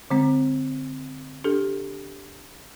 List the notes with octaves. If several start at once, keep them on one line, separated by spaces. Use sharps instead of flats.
D3 G#3 C4
D4 G4 A4